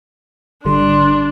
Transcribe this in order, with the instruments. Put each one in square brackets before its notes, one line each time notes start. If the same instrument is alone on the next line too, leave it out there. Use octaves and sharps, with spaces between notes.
[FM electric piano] G#1 D3 G3 [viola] D4 [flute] C6